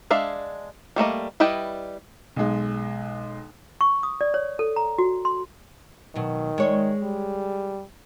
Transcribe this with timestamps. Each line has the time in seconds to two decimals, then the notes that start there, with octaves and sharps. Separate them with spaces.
0.11 G#3 D4 E5 F5
0.96 G3 A3 A#3 D#5
1.40 G3 E4 B4 D#5 G5
2.36 B1 G#3
3.81 C#6
4.03 D#6
4.21 D5
4.34 C#5
4.59 A4
4.76 A#5
4.98 F#4
5.25 C6
6.15 B2 D#3 F#3
6.58 G#3 C#5
7.03 G3